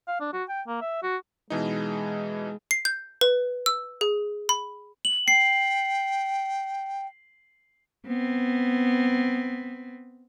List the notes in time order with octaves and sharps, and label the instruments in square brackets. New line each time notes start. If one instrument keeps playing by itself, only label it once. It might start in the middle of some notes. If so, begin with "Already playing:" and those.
[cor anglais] F5
D4
F#4
G5
A#3
E5
F#4
[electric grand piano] B2 E3 D#4 [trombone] G#3
[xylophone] C7
G6
B4
E6
G#4
B5
[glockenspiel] F#7
[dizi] G5 [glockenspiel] C7
[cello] B3 C4